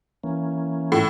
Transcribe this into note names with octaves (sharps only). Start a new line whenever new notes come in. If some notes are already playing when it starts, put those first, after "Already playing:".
E3 A#3 C#4
A2